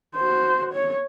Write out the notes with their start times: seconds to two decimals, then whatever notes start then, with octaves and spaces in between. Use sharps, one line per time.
0.15 F#4 C5
0.73 C#5